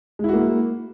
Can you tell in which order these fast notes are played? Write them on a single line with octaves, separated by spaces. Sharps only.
G#3 E4 F#4 A#3